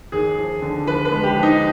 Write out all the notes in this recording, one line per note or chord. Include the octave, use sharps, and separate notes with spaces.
D#2 G#4
F3
D3
F3 B4
B4
G#3
G4
F3
D#4